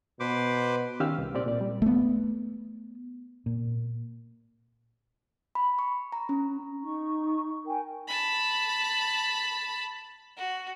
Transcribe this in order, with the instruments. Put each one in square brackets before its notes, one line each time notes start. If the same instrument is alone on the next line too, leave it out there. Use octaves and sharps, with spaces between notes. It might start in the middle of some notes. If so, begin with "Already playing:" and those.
[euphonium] B2 [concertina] B4 C5 D6
[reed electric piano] D#3 C#4 G4 F5 E6 F6
C2
A#2 C4 G4 D5
A#2 D5
G3
[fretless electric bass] A3 B3
[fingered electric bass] A#2
[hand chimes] B5
C#6
A#5
C#4
[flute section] D#4 C#6
A#4 G5 G#5
[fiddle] A5 B5
F#4